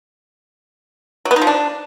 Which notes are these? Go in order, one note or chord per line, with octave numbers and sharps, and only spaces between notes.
F#3
B3
D#4
F3
D4